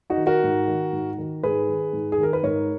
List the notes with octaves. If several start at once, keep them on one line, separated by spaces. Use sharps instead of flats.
D#4 F#4
D#3
F#4 A#4
G#2
D#3
G#2
D#3
G#2 G#4 B4
D#3
G#2
G#4
D#3 A#4
B4
G#2 A#4 C#5